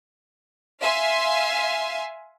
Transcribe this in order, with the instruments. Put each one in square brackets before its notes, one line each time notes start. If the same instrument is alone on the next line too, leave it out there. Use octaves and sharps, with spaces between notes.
[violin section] E5 F5 G#5 C6